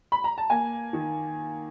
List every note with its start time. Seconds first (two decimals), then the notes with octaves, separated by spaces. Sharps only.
0.12 B5
0.24 A#5
0.38 A5
0.50 A#3 G#5
0.93 D#3